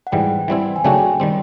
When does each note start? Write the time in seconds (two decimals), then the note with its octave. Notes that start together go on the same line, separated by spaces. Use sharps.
0.07 F#5
0.12 G#2 E3 G3 G5
0.48 E3 G3 C4 E4
0.76 G#5
0.84 C#3 F#3 A3 D4 F#4 G5
1.20 D#3 G3 C4